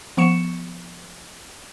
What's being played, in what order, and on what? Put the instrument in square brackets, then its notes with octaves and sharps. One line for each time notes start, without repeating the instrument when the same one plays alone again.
[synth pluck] F3 B3 C#6 C#7 E7